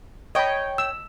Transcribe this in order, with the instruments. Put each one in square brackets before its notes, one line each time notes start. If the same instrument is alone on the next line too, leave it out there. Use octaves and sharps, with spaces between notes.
[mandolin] C#5 G5 [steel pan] D#5 B5
[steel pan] E6